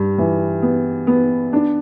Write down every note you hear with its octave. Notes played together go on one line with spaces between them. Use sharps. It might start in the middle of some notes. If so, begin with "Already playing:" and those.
Already playing: G2
E3
B3
B3
D4